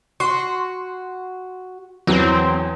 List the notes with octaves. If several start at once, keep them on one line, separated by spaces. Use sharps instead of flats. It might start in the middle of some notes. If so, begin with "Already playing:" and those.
F#4 C6
E2 E3 F#3 C4